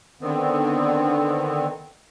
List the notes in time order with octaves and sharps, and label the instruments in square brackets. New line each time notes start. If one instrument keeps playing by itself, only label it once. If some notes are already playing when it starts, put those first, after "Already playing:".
[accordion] D3 D#3 B3 C4